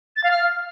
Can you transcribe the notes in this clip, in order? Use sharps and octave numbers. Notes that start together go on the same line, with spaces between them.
A6
F5
F6